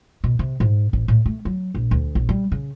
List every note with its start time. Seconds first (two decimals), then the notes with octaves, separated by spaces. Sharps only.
0.24 B2
0.39 C3
0.60 G#2
0.93 A1
1.08 A2
1.26 A3
1.45 F#3
1.75 A#1
1.91 D2
2.15 A#1
2.29 G3
2.52 C#3